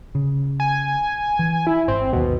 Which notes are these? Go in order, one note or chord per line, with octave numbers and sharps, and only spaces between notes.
C#3
G#5
E3
E4
G#1 C4
G#1 D#2 B2